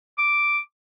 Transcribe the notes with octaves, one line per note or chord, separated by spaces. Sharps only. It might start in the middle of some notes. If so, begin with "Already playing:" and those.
D6